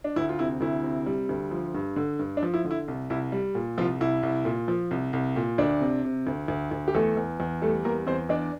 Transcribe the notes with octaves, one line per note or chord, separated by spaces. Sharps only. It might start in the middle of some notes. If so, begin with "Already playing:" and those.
D4
D2 E4
F4
C3 E4
D2 E4
C3
G3
D2
F3
G2
D3
G2
D4
F3
E4
D3
E4
C2
C2 E4
G3
A#2
C2 F3 F4
C2 E4
C2
A#2
F3
C2
C2
A#2
D2 D4
C3
C3
D2
D2
D2
G4
E2 A3 A4
E2
E2
G3 A3 A4
E2 A#3 A#4
E2 C4 C5
E2 D4 D5